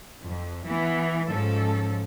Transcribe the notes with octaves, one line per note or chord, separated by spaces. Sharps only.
F2
E3 B3
G#2 F3 C#4 A4